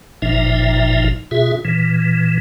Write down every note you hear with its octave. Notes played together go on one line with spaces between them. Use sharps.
G1 A#2 F3 D#4 E5
B2 F4 G#4 E5
A#2 E3